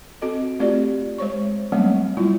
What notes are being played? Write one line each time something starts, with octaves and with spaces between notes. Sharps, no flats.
C4 F#4 A4 D#5
A3 C4 F4 G4 D5
G#3 C5 C#5 C#6
F#3 G3 A3 A#3 C4 C#4
F#3 G3 B3 E4 F4